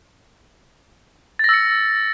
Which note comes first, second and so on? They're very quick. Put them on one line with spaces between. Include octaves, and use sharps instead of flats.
A6 A#6 E6 C#7